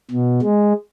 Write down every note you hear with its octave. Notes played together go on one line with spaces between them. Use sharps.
B2
G#3